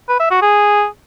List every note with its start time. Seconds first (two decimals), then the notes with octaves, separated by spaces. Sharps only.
0.09 B4
0.20 E5
0.31 F#4
0.42 G#4